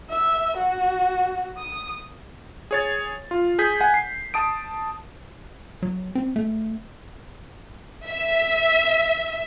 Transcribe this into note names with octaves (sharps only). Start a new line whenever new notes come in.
E5
F#4
D#6
G#4 C#5 A6
F4
G#4 G6 B6
F#5 G#5
C7
A5 D#6 D7
F#3
C4
A3
E5